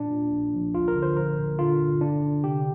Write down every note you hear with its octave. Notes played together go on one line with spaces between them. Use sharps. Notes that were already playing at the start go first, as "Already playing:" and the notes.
Already playing: A#2 D4
A#2
A#1
A#1
D2 F4
A#4
D3
C5
A#1 A#4
A#2
D3 F4
G1
D3 D4
D3
C3 G4